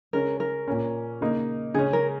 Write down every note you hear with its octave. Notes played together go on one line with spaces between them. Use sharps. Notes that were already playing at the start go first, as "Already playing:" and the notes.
C#3 G#3 C#4 A#4
A#4
A#2 A#3 C#4
C#3 A#3 D#4
C#3 G#3 C#4 G#4
A#4